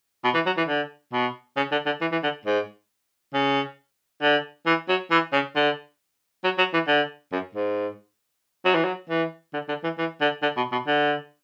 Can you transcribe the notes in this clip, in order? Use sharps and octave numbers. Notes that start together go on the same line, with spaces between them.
B2
E3
F#3
E3
D3
B2
C#3
D3
D3
E3
E3
D3
G#2
C#3
D3
E3
F#3
E3
C#3
D3
F#3
F#3
E3
D3
F#2
G#2
F#3
E3
F#3
E3
D3
D3
E3
E3
D3
D3
B2
B2
D3